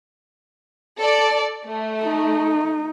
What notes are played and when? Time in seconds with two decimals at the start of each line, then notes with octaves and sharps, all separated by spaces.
0.98 A4 D5
1.65 A3
2.03 D#4